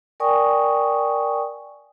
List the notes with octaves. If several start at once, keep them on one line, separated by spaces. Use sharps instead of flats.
A#4 D5 G5 G#5 C#6 D#6